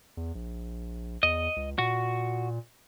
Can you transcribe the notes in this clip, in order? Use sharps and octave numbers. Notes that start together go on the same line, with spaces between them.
E2
A#1
E2 D#5
C#2
A#2 F#4